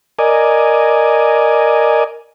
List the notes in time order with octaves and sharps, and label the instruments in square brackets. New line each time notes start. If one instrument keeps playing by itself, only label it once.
[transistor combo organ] A#4 D5 D#5 G#5